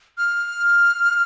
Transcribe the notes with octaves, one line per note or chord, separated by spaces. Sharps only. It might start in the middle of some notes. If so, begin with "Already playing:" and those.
F6